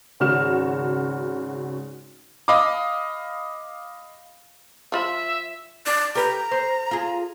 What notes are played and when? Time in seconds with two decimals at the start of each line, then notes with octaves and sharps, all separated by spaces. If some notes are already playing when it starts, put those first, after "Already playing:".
0.20 G#1 C#3 F#4 F6 E7
2.48 D#5 F5 B5 D6
4.92 F3 F4 E5 B5
5.87 D5
6.15 G4 B4 A#5
6.51 C5
6.91 F4 G#4